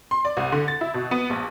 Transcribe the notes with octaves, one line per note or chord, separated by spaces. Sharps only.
C6
D5
C2
D3
A6
E4
B2
B3
A#1